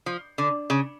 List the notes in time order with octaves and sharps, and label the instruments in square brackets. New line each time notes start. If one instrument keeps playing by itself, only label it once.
[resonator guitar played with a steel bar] F3
D3
C#3